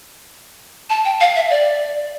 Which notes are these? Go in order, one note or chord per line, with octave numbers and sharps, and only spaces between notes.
A5
G5
F5
E5
D5